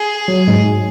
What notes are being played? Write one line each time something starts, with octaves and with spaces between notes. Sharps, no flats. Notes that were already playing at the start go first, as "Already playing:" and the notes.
Already playing: G#4
F#3
G#2 G#3